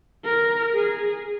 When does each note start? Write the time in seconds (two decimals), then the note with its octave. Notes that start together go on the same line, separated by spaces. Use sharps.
0.25 A#4
0.75 G#4